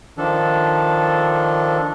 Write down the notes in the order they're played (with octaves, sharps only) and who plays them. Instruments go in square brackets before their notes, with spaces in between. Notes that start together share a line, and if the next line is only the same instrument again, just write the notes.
[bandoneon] D#3 F3 D4 A4